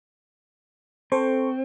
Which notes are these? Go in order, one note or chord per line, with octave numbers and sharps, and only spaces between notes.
C4 A4 C5 C#6